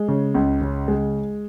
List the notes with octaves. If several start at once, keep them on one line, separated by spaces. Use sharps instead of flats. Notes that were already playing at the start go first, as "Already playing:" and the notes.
Already playing: G#3
C#3
C#2
C#3
G#3